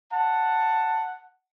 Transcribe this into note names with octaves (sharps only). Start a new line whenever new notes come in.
F#5 A5